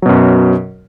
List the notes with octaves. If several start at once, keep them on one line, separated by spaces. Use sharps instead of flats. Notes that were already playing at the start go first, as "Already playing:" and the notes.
F#2 B2 F#3